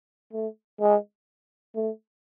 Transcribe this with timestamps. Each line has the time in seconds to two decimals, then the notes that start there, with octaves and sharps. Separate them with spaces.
0.33 A3
0.81 G#3
1.75 A3